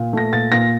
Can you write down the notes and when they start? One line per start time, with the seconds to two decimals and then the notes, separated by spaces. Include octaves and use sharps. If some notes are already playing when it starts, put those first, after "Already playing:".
Already playing: A#2
0.13 A3 A#6
0.32 A#2 A6
0.52 A#2 A#6